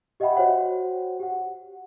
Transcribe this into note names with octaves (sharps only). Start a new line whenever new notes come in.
G4 D#5 E5 F#5 G5 B5
F#4 C5 C#5 F#5 G5
G4 F#5